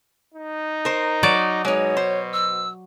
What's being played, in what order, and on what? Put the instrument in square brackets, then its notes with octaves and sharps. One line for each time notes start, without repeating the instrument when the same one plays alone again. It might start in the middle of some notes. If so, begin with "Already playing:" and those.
[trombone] D#4
[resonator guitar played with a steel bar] A#4 C5
[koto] F#3 D5
[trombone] B2 [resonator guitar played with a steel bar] G#3 D#4 [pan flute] C#5
[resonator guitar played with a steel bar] C5
[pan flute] E6